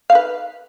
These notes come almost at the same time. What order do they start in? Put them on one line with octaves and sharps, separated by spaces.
F5 D#4 B4